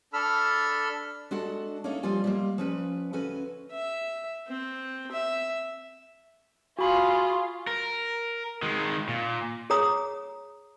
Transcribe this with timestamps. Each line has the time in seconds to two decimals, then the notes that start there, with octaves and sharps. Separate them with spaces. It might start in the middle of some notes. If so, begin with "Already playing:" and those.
0.13 D4 A4 B5 E6 F6
1.31 G#3 D4 F#4 A4 F#5 A5
1.84 A#3 C#4 D#4 A4 C#5 E5
2.03 F3 G3 A#3 F4 G#5
2.24 G3 G#3 A#3
2.58 F3 C#4 B4
3.13 D2 C#4 F#4 A4 B4 G#5
3.71 E5
4.47 C4
5.11 E5
6.79 F4 F#4 G#4 B5 C#6
7.67 A#4
8.62 D#3 G#3
9.08 A#2
9.70 G#4 C#5 A#5 D#6